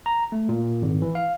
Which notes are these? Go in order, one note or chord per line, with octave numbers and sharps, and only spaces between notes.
A#5
A3
A#2
G#1
E3
F5